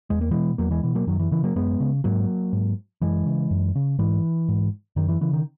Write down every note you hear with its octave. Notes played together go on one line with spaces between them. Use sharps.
E2 G#3
A#3
B2 E3 G#3
E2 F#3 A#3
E3 G#3
B2 E3
F#3 A#3
F#2 D#3 F#3
E3
C#3 E3
F#3 A#3
F#2 G#3 B3
C#3
G#2 F#3 A#3
G#2
F#2 E3 G#3
C#3
F#2
C#3
G#2 E3
G#2
F#2 D#3
E3
C#3 E3
D#3